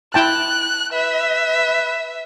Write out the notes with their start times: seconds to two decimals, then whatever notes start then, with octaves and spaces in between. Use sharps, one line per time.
0.14 E4 G5 A5 F#6
0.93 B4 E5